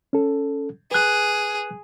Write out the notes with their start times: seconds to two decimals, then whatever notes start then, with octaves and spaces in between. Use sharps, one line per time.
0.13 C#4 A4
0.91 G#4 B4 F#6